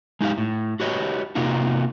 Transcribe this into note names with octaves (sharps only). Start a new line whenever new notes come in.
G#3 D#4 G4 F5
A2
F#4 G4 B4 C#5 D#5
C3 A#3 D#4 F4 F#4